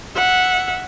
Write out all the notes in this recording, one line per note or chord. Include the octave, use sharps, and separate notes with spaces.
E5 F#5